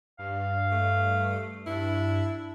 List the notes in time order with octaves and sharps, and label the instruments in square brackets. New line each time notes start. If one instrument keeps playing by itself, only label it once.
[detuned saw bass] G2 [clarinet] F5
[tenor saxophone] A3
[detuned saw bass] G2 [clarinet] D4 [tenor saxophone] E4